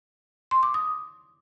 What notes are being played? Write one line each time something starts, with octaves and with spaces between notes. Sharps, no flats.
C6
D6
D#6